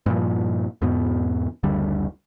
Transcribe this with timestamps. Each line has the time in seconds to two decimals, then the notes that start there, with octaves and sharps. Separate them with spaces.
0.06 G2 A#2 F3
0.82 E2 G#2 B2 B3
1.63 F#1 D2 D3 G3